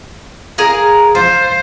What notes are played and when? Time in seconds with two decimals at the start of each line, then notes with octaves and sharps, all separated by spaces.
0.58 G#4 A#4 F5
1.15 F4 C5